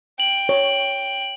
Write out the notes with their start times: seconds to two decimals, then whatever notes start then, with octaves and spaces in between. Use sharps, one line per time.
0.20 G5 F#7
0.49 C#5